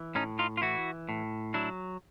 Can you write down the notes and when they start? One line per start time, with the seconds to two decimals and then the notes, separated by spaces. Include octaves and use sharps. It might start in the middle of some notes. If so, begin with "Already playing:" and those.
Already playing: E3
0.15 A2 C#4 D#4
0.39 D#4 F4
0.57 F4
0.62 E3 E4 F#4
1.09 A2
1.54 F#3 D4 E4